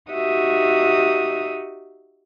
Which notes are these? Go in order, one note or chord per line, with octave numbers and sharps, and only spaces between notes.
D#4 F#4 G4 E5 D#6